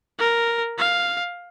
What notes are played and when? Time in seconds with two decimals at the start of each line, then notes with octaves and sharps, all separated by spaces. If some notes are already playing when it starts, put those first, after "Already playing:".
0.19 A#4
0.78 F5